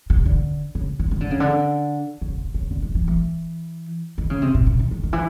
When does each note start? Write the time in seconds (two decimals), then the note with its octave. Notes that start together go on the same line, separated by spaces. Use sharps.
0.10 C3
0.26 D3
0.75 C#3
0.99 D#3
1.11 D#3
1.21 D3
1.31 C#3
1.40 D3
2.21 C#3
2.38 C3
2.54 C#3
2.71 D3
2.82 D#3
2.95 E3
3.08 E3
4.18 D#3
4.30 C#3
4.42 C3
4.55 B2
4.67 C3
4.79 D#3
4.91 D#3
5.03 D#3
5.13 E3